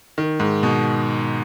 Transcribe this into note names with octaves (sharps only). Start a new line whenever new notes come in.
D#3
G#2
B2